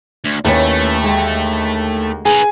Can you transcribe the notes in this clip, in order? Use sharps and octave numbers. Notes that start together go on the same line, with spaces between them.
D2
D#2 A3 C#4 E4 B4
D2 G#3 G5
D#4 G#4 B4 G#5